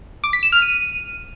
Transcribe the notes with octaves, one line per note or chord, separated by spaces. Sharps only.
D6
B6
E7
F6
D#7